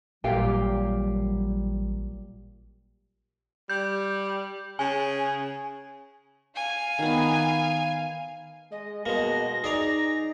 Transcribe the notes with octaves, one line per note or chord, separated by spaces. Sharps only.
A1 A#2 F#3 G3 G4 F5 G5
G3 G6
C#3 G#5
F5 G#5
D#3 B3
G#3 D#5
B2 G#3 A#3 A#6
D#4 G#4 D5 A#5